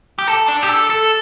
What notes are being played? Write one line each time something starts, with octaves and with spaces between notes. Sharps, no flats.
G4
A4
D4
G4
A4
A4